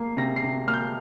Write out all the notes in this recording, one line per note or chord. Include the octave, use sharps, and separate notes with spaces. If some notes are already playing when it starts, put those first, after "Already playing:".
Already playing: A#3 C7
C3 A#6
C7
C3
A#3 F6
G6